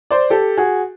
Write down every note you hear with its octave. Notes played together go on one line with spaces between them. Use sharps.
C5 D5
G4 A4
F#4 G#4